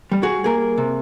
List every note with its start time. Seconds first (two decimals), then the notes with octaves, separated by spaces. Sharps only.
0.12 G3
0.23 F#4 G#4
0.44 A#3 G#4 A#4
0.78 C3